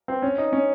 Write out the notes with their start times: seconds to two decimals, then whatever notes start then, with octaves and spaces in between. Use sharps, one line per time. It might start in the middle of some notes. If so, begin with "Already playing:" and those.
0.08 C4
0.22 C#4
0.38 D#4
0.53 C#4